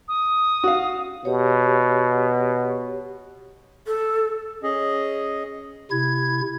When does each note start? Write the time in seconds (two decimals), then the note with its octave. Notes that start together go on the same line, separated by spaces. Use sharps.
0.08 D#6
0.64 F#4 F5
1.25 B2 G4 C#5
3.87 A4
4.63 C#4 G#4 D#5
5.91 C3 E4 G#6